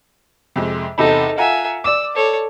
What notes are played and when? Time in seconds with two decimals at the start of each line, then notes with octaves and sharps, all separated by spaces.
0.56 F2 C3 G#3
0.98 E2 C3 D#4 A4 B5
1.38 F4 E5 F#5 G#5 A#5
1.84 D5 D6 E6
2.15 A4 C#5